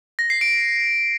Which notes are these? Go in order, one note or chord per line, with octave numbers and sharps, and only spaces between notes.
A#6
C7
D7